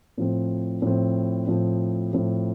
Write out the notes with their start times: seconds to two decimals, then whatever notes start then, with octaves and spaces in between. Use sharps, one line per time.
0.18 A2 F3 C4
0.82 A2 F3 C4
1.47 A2 F3 C4
2.13 A2 F3 C4